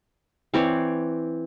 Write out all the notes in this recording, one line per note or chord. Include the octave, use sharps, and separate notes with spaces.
E3 C4 C#5 D5